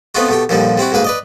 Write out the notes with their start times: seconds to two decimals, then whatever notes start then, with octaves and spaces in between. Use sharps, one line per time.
0.15 A3 B3 C4 D#4 F4 F#4
0.29 B2 A3 G4
0.49 D#2 A#2 D3 F3 G3 A#3
0.78 G3 C4 E4 F#4
0.92 D2 G#2 A#3 B4 F5
1.04 B4 D5 D#5